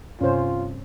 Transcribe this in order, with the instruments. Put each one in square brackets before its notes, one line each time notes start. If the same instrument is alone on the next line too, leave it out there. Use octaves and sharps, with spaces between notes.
[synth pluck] G2 C3 [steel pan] C#4 C5 [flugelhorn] F4